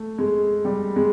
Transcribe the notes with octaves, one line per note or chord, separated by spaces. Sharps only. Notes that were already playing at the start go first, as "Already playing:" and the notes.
Already playing: A3
G#3
G3
G#3